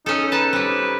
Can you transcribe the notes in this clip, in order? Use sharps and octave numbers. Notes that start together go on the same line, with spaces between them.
C#4 D#4 A4
D#4 A4 B4 A5
G3 C4 B4